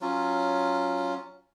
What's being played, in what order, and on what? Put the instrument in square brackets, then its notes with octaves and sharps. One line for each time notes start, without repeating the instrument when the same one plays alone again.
[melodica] F#3 C#4 F4